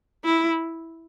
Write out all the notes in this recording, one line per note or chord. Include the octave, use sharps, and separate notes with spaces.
E4